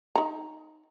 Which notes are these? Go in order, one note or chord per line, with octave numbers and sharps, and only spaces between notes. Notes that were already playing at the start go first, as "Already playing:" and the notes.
D#4 A#5